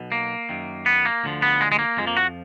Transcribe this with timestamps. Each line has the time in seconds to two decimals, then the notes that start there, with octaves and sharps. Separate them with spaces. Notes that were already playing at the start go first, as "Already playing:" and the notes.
Already playing: B1 B2
0.12 A#3
0.49 F#2 D#3
0.86 B3
1.05 A#3
1.24 D2 D3 F3
1.42 B3
1.61 G#3
1.72 G#3
1.79 A#3
1.97 F2 F3 G#3
2.07 A#3
2.17 F#4